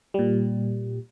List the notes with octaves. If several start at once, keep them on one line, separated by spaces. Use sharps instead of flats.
A#2 G3